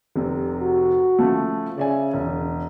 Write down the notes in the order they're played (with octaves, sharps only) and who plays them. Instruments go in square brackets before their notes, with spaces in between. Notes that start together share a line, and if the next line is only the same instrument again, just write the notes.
[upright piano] F1 C3
[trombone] F#4
[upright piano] C#3 F3 A3
[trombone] C#3 [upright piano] D5 E5 G#5
[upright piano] E1